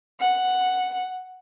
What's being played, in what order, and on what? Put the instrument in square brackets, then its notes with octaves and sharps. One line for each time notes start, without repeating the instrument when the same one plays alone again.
[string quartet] F#5